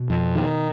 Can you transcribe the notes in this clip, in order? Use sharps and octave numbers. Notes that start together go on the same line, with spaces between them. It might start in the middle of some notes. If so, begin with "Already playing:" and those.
Already playing: B2
F2
D#3